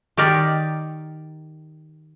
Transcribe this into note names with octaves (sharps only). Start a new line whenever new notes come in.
D#3 G4 A#4 D5